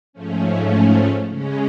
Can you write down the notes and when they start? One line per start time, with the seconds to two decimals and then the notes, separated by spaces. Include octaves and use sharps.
0.13 G#2 F3 A3 C#4
1.29 C#3 G#3 C#4